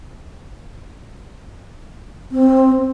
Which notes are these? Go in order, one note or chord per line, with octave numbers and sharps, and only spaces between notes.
C4